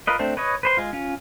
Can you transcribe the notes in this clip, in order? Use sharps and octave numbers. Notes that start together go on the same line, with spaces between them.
F4 A#4 B4 D#5
A3 C4 D4 C5
B4 C#5 D#5
B4 C5 C6
G#3 F4
C#4 F4